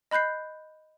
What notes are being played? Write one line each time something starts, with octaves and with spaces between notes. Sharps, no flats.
D#5 B5 F#6 G6 C7